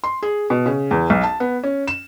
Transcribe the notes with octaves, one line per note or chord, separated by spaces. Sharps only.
C6
G#4
B2
C#3
E2
B1
A5
B3
C#4
E7